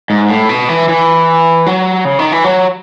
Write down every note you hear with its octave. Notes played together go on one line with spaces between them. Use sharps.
G#2
A2
B2
E3
E3
F#3
C#3
D#3
E3
F#3